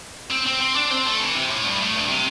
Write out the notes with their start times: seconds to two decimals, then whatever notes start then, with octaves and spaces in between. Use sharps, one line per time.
0.31 C4
0.46 C4
0.61 C4
0.76 D4
0.91 C4
1.06 A3
1.20 E3
1.35 C3
1.50 A2
1.64 G2
1.79 A2
1.94 G2
2.09 C3